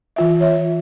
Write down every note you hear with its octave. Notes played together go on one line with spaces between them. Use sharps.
E3 F4 E5
C#5 E5